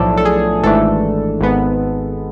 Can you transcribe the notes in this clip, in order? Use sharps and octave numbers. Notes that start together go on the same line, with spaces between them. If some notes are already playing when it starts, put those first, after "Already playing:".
Already playing: B1 A2 F3 A3 D4 A4
A4
G#4
G#1 G#2 E3 A3 D4 A4
G#1 G#2 G#3 B3